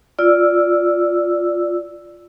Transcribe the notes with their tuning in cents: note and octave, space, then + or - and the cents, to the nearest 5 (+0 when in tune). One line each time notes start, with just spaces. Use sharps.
F4 +0 D5 +0 E6 +0